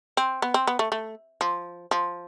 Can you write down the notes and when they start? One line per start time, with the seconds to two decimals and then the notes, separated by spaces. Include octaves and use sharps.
0.17 C4
0.42 B3
0.54 C4
0.67 B3
0.79 A3
0.92 A3
1.41 F3
1.91 F3